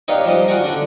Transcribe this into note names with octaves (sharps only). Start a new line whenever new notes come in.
D#4 G4 B4 C#5 D5 F5
F3 G3 C5 D#5
F4 F#4 D5 F#5 G#5 A#5
D3 D4